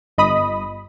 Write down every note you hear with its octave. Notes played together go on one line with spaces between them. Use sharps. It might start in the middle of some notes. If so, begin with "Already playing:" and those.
G1 D#5 B5 D#6